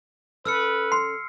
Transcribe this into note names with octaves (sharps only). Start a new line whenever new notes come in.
C#4 A4 B4 D5 E6 F6 C#7
C6 C7